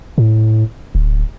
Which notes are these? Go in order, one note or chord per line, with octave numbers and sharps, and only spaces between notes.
A2
D1